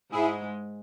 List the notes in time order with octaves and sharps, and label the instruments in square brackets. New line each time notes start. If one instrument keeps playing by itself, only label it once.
[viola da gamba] G#2 G#3 [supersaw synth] E4 G#4